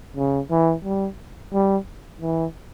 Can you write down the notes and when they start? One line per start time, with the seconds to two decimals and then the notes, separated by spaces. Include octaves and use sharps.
0.17 C#3
0.51 E3
0.85 G3
1.53 G3
2.22 E3